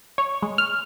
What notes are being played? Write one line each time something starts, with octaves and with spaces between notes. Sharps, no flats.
C#5
G#3
F6